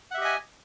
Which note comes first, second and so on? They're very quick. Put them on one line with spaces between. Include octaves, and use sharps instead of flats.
F#5 E5 G4 D#5 G#5